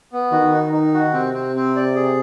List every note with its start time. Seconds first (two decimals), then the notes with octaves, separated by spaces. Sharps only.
0.13 B3
0.32 D#3 F#4
0.53 D#4
0.73 D#4
0.94 F#4
1.14 C3 C4
1.34 C4
1.56 C4
1.76 D5
1.96 G#4